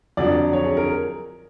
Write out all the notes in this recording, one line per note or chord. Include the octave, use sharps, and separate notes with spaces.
F2 D3 F#3 D5
C#5
G#4
A#4